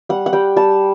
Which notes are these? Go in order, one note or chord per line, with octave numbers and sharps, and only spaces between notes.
G3 F#5
F#5
G3 G5
G3 A5